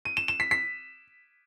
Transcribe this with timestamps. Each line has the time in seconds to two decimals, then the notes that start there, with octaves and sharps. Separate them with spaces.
0.05 D#7
0.17 E7
0.28 E7
0.40 B6
0.51 B6